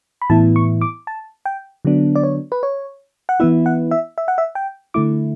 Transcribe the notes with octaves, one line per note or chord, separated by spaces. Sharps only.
B5
A2 E3 B3 E4 A5
C#6
D6
A5
G5
D3 F#3 B3 D4
D5
C#5
B4
C#5
F#5
E3 B3 E4 E5
F#5
E5
E5
F#5
E5
G5
D3 A3 E4 D6